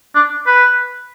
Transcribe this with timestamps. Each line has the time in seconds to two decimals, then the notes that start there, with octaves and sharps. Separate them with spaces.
0.15 D4
0.46 B4